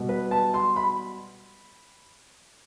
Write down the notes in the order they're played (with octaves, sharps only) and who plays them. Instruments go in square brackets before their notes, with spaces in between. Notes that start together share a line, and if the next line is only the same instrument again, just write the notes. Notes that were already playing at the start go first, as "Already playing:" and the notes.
Already playing: [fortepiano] B2 G3 B3
B4
A5
C6
B5